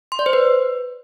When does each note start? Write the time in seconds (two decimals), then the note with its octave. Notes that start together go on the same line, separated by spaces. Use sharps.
0.12 C6
0.19 D5
0.26 C5
0.33 B4